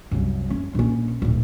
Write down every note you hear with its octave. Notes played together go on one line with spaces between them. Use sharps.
C2 F#2
C#4
A#1 C#4
D1 A#1